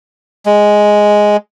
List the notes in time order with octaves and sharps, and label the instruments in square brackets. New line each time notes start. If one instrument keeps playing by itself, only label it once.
[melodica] G#3